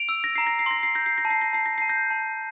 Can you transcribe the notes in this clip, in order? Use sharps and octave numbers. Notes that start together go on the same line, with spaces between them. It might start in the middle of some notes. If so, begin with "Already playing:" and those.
Already playing: D7 F7
E6
A#6
A#5 C7
A#6
C7
C6 A#6
C7
G6 A#6
C7
A#6
A5
C7
A#6
A5 C7
A#6
A5 C7
G6 A#6
A5